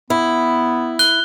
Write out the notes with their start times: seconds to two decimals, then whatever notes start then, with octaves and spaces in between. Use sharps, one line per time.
0.10 B3 E4
0.99 F#6 G7